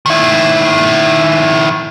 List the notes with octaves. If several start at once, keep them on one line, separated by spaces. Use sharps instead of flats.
D#3 E4